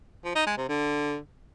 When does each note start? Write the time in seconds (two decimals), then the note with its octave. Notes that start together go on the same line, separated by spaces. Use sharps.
0.24 F3
0.36 D#4
0.47 G#3
0.58 C3
0.69 D3